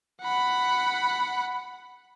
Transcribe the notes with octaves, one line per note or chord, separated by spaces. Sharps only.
F#5 B5